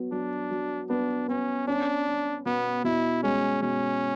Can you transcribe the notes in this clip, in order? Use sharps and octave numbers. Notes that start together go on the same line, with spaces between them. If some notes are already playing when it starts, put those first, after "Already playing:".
Already playing: F#3 B3
F#3 D4
F#3
B3 D4
B3 C#4
C#4 D4
C#4
B2 B3
B2 E4
G#3 C#4
B2 C#4